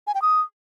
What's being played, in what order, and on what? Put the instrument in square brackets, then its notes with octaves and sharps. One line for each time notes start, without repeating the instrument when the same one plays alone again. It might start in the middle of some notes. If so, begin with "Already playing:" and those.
[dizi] G#5
G5
D#6